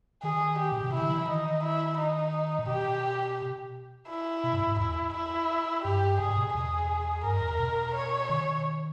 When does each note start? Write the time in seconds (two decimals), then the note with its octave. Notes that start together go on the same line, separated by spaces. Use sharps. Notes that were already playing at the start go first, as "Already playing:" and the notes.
0.23 D#3 G#4
0.58 G4
0.72 A#2
0.81 B2
0.92 C#3 E4
1.02 D#3
1.10 E3
1.28 D#3 D#4
1.63 E4
1.98 D#4
2.59 A#2
2.68 B2 G4
4.08 E4
4.44 B2
4.53 G2
4.61 G#2
4.79 E2 E4
5.14 E4
5.84 G2 G4
6.19 G#2 G#4
6.37 B2
6.54 E2 G#4
7.24 G2 A#4
7.41 E2
7.59 B2
7.95 C#5
8.29 D#3